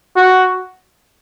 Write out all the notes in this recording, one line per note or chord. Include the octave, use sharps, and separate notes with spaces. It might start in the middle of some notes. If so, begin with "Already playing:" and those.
F#4